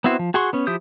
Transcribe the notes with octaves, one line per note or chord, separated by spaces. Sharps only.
B3 C4 E4 F#4 C5
F3
F#4 G#4 F#5 C6 C#6
B3 C#4
F3 E4 G4 D#6 G6